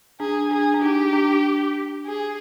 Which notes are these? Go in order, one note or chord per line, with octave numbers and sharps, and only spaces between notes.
D4 G#4
D4 G#4
D4
D#4 G4
D4
G#4